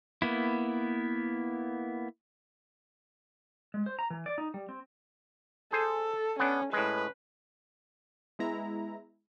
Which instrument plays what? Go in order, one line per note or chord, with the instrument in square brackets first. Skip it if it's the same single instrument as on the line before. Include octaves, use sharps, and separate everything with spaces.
[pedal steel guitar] A#3 B3 E4
[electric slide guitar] G#3
C5
A#5
E3
D5
D#4
G3
C4
[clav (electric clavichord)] G#4 C5 [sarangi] A4
[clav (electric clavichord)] B3 D4 [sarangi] C#4
[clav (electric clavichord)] A2 G#3 [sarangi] B4
[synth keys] G#3 B3 E4 A#5